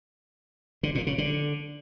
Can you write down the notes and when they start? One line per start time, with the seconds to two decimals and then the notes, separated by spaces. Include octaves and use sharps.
0.83 D3
0.95 A#2
1.07 C#3
1.18 D3